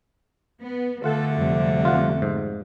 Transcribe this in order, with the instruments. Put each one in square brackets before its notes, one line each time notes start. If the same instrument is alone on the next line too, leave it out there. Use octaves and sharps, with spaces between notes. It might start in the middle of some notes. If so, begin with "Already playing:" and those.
[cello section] B3
[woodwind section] D3 A3 [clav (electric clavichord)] F4 F#5 [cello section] A4
[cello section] F2 C3 G3
[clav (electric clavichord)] F4 F#5
G#2